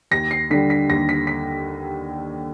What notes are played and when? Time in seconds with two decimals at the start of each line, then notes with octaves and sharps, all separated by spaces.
0.11 D#2 A#6
0.31 C7
0.50 D3 G3 B6
0.70 B6
0.89 D#2 A#6
1.09 B6
1.27 B6